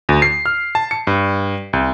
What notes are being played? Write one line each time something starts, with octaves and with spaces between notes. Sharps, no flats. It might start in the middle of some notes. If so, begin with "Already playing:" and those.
D2
C7
F6
A5
C#7
G2
C2